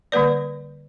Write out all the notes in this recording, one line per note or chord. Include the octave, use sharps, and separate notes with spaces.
D3 G3 A#3 B4 D5